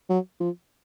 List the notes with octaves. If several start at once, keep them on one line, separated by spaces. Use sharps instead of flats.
F#3
F3